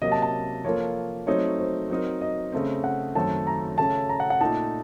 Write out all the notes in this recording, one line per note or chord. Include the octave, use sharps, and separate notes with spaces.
C3 F#3 A#3 D#5
A5
A5
F3 A#3 F4 A4 C#5
F#3 A3 C4 D#4 C#5
C5
F#3 C4 D#4 A#4
D#5
C#3 A3 C4
F#5
F#2 D#3 F#3 A3 C4 A5
A#5
C#3 A3 C#4 A4 A5
A#5
F#5
F#5
A#2 A3 D#4 A5